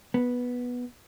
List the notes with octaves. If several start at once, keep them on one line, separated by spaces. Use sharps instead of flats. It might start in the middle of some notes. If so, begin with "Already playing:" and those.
B3